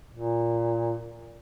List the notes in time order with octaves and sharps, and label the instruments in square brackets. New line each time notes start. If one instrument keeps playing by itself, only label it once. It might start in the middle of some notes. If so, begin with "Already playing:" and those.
[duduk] A#2